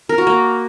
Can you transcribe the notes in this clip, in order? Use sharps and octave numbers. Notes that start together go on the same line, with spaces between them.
A#4
F#4
A#3